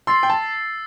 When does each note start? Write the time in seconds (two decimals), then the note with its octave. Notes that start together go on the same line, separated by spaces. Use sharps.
0.07 C6 E6 A6 C7
0.23 G5
0.30 A5